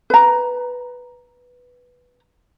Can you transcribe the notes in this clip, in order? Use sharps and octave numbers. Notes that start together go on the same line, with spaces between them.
B4 A#5